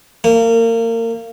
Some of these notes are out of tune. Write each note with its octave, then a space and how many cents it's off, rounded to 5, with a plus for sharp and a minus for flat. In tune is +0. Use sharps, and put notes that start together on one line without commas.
A#3 -30